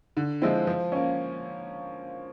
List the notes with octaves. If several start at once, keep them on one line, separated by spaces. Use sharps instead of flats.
D3
F3 G#3 C4 E4
F3
A#3 C#4